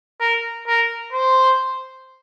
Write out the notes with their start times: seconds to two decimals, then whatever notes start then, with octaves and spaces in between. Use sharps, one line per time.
0.20 A#4
0.66 A#4
1.13 C5